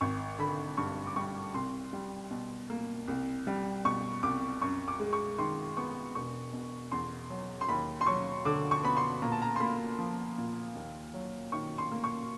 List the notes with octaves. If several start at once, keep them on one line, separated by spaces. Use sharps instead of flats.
G#1 C#6
D3 B5
G2 C#6
D6
G3 C#6
C2 C6
G3
B2
A#3
C2
G3
B2 C#6
C2 D6
F#2 C#6
D6
G#3
C#6
D#3 C6
B3 C#6
E1 C#6
B2
E2 C6
F#3
C6
D#2 B5
C6
F#3 C#6
D3 D6
C#6
B3 B5
C6
A#2 A#5
A5
A#5
C6
A#3 B5
F3
A#2
D#2
F#3
D#3 C#6
C6
A#3
C#6